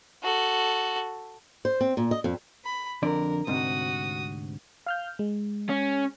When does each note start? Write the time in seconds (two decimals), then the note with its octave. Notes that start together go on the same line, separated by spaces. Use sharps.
0.23 F#4 A4
1.65 C5
1.81 C4
1.97 A#2
2.11 D#5
2.24 F2
2.64 B5
3.03 F2 D3 A#4 D5
3.47 D2 G#2 C3 F#4 D#6
4.86 F5 F6 G6
5.19 G#3
5.69 C#4